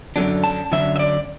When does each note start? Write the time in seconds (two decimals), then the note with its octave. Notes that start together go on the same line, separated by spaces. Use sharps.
0.16 F#2 D3 F#3 D4
0.44 A5
0.72 F#2 D3 F#3 D4 E5
0.96 E5
0.99 D5